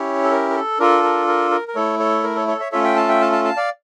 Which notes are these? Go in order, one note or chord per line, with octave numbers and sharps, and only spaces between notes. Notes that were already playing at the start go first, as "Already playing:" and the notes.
Already playing: C#4 E4 G4 C#5
A4
A#4
A#4
A4
D4 F4 A4 A#4
A#4
A#4
A#4
A#4
A3 E4 A4 C#5
A4 C#5
A#4
A4 C#5
A4 C#5
C#5 E5
A3 C#4 F4 A4 C#5 E5
E5 G5
F5 A5
E5 G5
F5 A5
F5 A5
F5 A5
D5 F5